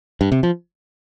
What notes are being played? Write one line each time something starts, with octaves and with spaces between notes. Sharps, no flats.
G2
C3
F3